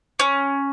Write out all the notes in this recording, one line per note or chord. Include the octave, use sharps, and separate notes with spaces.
C#4